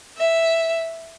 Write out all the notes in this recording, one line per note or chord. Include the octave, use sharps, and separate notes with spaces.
E5